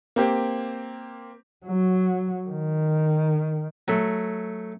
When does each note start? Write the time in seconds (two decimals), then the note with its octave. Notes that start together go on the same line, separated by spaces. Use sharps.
0.16 A#3 C4 G4
1.66 F#3
2.49 D#3
3.88 F#3 A3